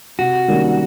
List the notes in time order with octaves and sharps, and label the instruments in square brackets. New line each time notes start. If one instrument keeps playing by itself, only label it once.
[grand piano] C3 [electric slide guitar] F#4
[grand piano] D#3 G3 A#3 C#4